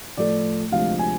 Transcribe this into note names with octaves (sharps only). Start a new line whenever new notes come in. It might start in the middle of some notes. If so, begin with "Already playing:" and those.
A2 F3 A3 D5
D2 C3 F3 G#3 F5
G#5